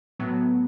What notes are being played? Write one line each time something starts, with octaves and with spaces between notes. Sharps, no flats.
A2 F#3 B3